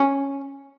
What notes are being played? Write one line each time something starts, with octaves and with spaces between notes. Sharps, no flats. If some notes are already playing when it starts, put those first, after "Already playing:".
Already playing: C#4